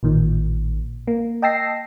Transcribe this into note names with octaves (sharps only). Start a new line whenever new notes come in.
A1 A#2 D#3
A#3
D#5 G5 A5 E6 A#6 C7